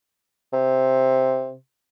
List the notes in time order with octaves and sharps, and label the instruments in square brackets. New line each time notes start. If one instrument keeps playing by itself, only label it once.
[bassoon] C3